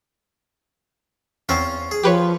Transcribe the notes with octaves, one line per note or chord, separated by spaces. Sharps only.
E2 C4 C#4 F4
G#4
F3 G4 B4 C#5